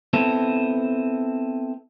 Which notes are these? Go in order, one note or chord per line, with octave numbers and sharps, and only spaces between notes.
B3 C4 E4 A4